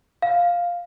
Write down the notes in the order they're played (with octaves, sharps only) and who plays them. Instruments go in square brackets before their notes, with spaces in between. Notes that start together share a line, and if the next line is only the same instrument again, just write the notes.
[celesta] F5